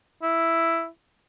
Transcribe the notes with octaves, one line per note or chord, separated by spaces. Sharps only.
E4